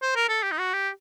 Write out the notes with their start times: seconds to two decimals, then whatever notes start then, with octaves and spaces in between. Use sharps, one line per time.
0.02 C5
0.16 A#4
0.29 A4
0.43 G4
0.51 D#4
0.58 F#4
0.73 G4